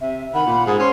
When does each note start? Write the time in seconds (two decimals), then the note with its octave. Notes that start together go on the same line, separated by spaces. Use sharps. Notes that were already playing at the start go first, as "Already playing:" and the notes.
0.01 C3 E5
0.34 D#3 F#5 B5
0.46 A#2
0.66 G#2 G#4
0.79 C#4 C5 C6